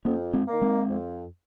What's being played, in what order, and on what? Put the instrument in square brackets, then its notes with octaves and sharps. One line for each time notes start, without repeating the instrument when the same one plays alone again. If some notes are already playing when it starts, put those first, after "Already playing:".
[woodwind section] F2 [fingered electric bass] A#3 C#4
[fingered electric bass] G#3 C4
[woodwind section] D#3 A#3
[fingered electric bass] G#3 C4
[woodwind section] F2